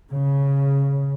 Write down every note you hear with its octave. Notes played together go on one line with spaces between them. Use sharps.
C#3